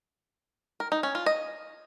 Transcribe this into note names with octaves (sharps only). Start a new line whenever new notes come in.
A#4
D#4
C#4
F4
D#5